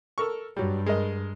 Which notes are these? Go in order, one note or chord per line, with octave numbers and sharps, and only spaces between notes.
A4 A#4 C#6
G2 F#3 G3
G#3 A#4 D#5